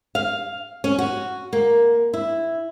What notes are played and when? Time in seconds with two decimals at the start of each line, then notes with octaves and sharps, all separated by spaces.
0.15 F5
0.84 C#4
0.98 F#4
1.53 A#3
2.14 E4